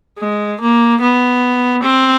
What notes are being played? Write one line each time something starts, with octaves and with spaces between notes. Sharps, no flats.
G#3
A#3
B3
C4